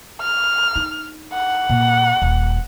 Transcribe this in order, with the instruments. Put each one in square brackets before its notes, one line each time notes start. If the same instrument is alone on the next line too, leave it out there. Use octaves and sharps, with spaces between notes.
[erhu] F6
[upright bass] D4 D#4
[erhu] F#5
[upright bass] A#2
D#1